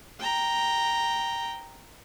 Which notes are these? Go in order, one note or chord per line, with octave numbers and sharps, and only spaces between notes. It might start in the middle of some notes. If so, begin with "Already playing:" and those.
G5 A#5